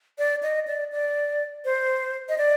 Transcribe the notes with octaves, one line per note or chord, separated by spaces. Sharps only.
D5
D#5
D5
D5
C5
D#5
D5